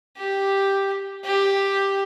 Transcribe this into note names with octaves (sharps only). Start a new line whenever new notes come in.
G4
G4